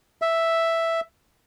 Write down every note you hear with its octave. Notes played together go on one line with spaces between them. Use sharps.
E5